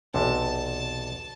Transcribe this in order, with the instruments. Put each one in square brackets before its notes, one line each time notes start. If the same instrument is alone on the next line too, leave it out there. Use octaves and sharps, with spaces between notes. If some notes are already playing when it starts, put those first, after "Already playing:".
[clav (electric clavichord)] B1 E2 C3 [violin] A5